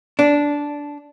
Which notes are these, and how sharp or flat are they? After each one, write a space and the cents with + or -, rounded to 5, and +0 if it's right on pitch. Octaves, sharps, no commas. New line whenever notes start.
D4 -10